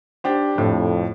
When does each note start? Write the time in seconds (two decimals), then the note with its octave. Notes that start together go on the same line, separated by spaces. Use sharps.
0.24 D4 G4 C5
0.58 F2 A2